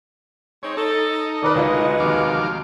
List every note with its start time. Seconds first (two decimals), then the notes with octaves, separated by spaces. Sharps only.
0.63 G#3 C4 D#4 C#5
0.77 D#4 A4
1.42 D#3 A#4 B4 D5
1.55 D2 F#3 G#3 F4 B4 D#5
2.00 F1 D#2 D#3 F5 D6